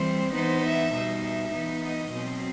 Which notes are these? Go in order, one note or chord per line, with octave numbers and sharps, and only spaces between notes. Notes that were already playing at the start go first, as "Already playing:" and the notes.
Already playing: E3 G3 C4 C5
E3 B3 D#4 C5
E5
B2 G3 D#4
E5
E3 B3 D#4
D#5
B2 F#3 C4